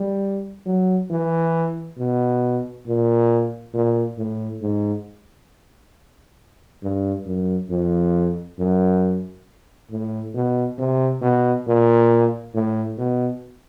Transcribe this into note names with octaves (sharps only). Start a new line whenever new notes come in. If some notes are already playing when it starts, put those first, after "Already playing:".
Already playing: G3
F#3
E3
B2
A#2
A#2
A2
G#2
G2
F#2
F2
F#2
A2
B2
C3
B2
A#2
A2
B2